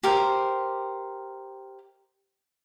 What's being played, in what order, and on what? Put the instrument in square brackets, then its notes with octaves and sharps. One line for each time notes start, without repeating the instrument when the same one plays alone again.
[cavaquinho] G4 A#4 C5